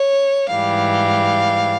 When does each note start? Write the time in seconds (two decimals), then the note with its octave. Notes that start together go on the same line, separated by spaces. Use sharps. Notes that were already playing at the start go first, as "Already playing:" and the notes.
Already playing: C#5
0.50 G#2 E3 G3 F5